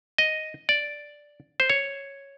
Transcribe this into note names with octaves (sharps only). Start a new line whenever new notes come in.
D#5
D5
C5
C#5